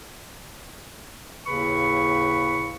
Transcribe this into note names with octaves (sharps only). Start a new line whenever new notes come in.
D#2 A2 C#3 B4 B5 C#6